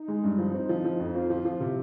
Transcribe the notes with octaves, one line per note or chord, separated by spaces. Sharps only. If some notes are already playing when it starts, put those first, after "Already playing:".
Already playing: D#4
G#3
G2
F3
C4 D#4
F3
F3
F2
C4 F4
F3
F3
C3